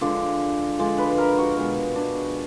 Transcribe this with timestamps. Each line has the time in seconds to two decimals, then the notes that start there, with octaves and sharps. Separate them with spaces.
0.01 D3 F3 G#3 D5
0.79 D3 F3 G#3 D5
0.98 B4
1.18 A#4
1.38 F#4
1.57 B2 G#3
1.96 D4